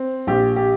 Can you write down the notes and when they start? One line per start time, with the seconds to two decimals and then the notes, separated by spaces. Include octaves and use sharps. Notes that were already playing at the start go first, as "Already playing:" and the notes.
Already playing: C4
0.27 A#1 G4
0.56 G4